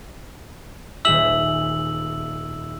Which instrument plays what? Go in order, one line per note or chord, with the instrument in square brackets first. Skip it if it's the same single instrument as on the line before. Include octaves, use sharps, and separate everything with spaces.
[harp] D#1 G#4 E5 [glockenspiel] E6 F#7